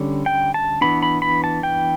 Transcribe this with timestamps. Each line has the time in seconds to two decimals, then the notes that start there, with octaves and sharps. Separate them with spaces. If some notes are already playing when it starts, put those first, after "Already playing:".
Already playing: D3 G3 C#4
0.26 G5
0.54 A5
0.81 E3 B3 D4 B5
1.03 B5
1.22 B5
1.44 A5
1.63 G5